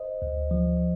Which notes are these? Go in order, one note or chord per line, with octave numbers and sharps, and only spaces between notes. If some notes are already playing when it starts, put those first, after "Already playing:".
Already playing: C5 D#5
D2
F3